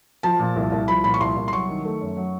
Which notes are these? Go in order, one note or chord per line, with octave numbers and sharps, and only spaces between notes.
F3 A5
A#2
C2
C2
F3 B5
A#2 B5
C#6
C2 C6
C2
C6
F#3 C#6
D#3
A3
F#2
F#3